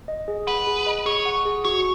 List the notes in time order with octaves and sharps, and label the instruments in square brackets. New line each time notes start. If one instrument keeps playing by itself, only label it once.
[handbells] D#5
G#4
[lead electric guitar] B4 [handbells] F#5
[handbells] G#4
D#5
[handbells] G#4 [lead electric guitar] C#5
[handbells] F#5
G#4
[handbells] F#4 [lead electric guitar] C#5